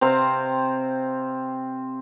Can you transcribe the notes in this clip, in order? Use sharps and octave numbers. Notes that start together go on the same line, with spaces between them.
C3 C4 C5 F5